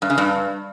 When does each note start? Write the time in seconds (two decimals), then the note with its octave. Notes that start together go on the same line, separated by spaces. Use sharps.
0.02 G2
0.10 C#3
0.18 G2